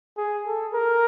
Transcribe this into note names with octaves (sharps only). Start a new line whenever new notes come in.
G#4
A4
A#4